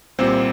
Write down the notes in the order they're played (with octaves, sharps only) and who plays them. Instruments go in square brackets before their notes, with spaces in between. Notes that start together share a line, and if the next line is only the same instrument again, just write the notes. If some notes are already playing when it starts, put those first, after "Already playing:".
[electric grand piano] C2 A#2 G3 A#3 C4 C5